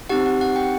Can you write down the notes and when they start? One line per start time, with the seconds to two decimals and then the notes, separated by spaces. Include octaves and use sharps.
0.09 C4 D#4 G4 F#5
0.26 F#5
0.41 F#5
0.56 G5